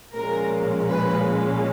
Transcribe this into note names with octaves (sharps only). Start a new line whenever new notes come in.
A#2 F3 G#3 C#4 A#4
B4